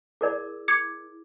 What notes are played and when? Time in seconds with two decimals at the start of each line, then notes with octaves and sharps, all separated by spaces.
0.21 E4 G#4 A#4 D5
0.68 D6 G#6 C#7